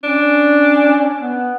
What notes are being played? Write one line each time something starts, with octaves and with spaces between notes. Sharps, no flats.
C#4 D4
B3